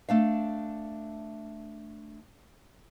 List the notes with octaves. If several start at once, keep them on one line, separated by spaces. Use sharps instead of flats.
A3 D4 F5